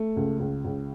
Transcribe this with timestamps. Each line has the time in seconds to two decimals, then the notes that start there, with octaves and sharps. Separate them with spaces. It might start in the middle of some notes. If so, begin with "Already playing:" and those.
Already playing: A3
0.16 C#2
0.40 C#2
0.65 C#2